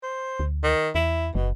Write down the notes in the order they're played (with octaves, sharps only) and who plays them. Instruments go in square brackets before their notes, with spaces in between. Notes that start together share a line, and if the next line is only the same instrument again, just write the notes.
[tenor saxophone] C5
[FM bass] D2
[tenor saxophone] D#3
[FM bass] E2 [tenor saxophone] E4
[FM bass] F#1 [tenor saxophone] B2